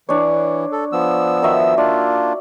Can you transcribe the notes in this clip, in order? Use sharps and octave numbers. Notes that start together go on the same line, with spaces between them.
E3 D4 C#5
A4
F3 B3 E6
D#3 F#4 E5
A#3 D4 F4 D5